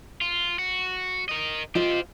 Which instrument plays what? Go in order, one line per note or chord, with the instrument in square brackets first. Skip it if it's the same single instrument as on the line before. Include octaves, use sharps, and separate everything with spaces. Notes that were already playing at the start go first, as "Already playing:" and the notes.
[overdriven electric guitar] F4
F#4
A#4 D#5
[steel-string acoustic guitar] F4 D#5 [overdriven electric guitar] G4 C5